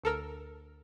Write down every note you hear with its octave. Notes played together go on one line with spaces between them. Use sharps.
D2 A4 A#4 E6